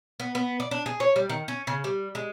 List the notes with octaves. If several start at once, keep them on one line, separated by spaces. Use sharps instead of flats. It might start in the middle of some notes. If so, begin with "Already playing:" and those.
B3
B3
D5
D4
G#4
C#5
G3
D#3
C#4
C#3
G3
G#3